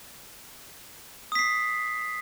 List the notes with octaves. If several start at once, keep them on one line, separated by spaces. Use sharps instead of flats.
D#6 B6 C7